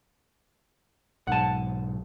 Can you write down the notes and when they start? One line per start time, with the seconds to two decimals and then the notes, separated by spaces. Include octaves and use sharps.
1.27 B1 G#2 F#5 A5